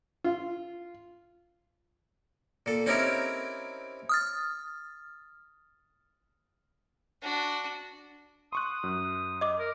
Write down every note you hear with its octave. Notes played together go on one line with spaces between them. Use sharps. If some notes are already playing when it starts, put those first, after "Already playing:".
F4
A#2 A4
C4 C#4 D#4 E4 G4 A#4
D#6 F6 A6
D4 F#4
C6 C#6 D#6 F#6
F#2
D#5 D6
A#4